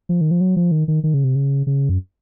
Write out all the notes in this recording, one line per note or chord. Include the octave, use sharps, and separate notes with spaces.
F3
D#3
F3
F#3
F3
D#3
D#3
D#3
C#3
C3
C#3
C#3
F#2